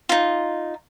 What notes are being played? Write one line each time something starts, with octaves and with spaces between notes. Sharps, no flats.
D#4 F4